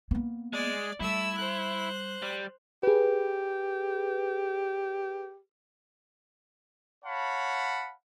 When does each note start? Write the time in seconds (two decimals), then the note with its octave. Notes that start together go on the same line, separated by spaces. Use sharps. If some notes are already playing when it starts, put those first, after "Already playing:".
0.11 A#3 B3
0.53 G#3 D5
1.00 G3 A3 E4 E6
1.37 C5 F#6
2.23 G3
2.83 G4 G#4 B4
7.05 C#5 F5 F#5 A5 B5